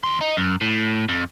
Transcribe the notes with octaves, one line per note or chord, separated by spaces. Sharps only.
D#2 C6
D#4
F#2
A2
F2